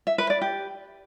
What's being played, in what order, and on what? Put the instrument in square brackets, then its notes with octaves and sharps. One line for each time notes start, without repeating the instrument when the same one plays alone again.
[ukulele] E5
B4
D5
G4